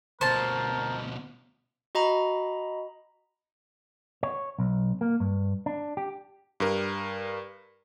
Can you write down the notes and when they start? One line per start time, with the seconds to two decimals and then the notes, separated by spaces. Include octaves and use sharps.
0.21 D2 B2 A#4 C5 A5
1.95 F#4 D#5 A#5 B5
4.23 C#5
4.59 B1
5.01 A#3
5.20 G2
5.66 D4
5.97 G4
6.60 G2 A#4